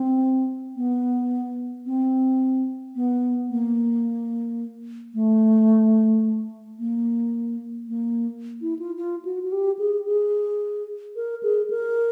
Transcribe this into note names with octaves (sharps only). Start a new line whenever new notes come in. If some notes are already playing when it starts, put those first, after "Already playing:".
Already playing: C4
B3
C4
B3
A#3
A3
A#3
A#3
E4
F4
F4
F#4
F#4
G4
G#4
G#4
A#4
G#4
A#4